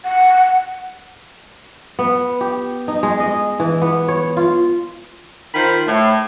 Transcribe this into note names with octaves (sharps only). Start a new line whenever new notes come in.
F#5
B3
G4
D#4
G#3
D#5
E3
B3
C#5
F4
D#3 F4 C5 F5 B5
A2